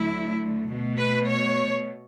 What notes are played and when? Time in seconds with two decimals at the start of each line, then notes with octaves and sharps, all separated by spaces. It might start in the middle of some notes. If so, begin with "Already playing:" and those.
Already playing: D2 D3 F#3 A3 E4
0.68 B2 A3
0.98 B4
1.28 C#5